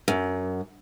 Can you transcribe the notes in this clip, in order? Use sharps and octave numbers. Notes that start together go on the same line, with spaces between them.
F#2